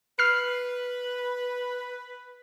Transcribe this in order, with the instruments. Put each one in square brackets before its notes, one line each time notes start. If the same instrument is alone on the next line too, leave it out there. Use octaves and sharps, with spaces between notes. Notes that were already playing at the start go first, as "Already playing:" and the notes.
[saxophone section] B4 [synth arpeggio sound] F6 C7